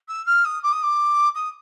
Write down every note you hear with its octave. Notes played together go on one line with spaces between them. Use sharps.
E6
F6
D#6
D6
D#6
D6
D#6